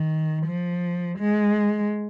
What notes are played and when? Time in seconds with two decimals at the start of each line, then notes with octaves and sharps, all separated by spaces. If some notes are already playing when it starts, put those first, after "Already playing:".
Already playing: D#3
0.46 F3
1.19 G#3